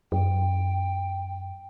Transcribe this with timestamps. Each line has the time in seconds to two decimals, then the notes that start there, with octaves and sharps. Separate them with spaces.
0.12 F#2 G5